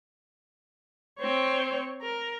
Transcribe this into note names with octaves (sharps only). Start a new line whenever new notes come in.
C4 C#5
A#4